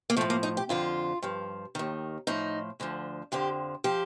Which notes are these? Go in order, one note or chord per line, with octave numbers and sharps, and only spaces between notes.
A#3
A2 F3 A3
A#3
D#4
G4
F2 D3 F3 F4
G2 F3
D#2 D#3
A2 F3 D#4
D2 D3 F3
F2 D3 F3 G4
F3 G4